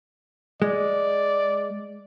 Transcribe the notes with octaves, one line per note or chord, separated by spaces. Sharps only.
G#3 D5